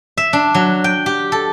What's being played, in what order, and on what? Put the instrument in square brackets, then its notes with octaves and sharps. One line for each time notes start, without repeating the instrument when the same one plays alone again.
[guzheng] E5
D4
F#3
G5
G4
A4